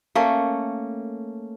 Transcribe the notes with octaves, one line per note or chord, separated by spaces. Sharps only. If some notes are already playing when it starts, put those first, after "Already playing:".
A3 A#3 C#4